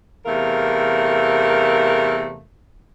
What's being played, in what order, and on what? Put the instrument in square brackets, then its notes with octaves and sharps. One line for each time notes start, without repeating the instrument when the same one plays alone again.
[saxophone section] E2 C3 A3 A#4 F5